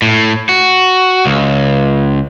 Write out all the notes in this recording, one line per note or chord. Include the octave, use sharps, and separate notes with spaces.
A2
F#4
C#2